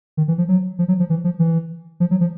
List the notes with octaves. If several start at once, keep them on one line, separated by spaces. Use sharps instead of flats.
D#3
E3
F3
F#3
F3
F#3
F3
E3
F3
E3
F3
F#3
F3